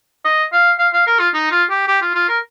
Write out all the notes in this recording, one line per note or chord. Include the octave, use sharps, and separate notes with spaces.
D#5
F5
F5
F5
A#4
F4
D#4
F4
G4
G4
F4
F4
A#4